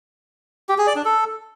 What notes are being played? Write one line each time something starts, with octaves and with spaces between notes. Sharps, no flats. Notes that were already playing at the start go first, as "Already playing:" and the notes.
G4
G#4
D5
D4
A4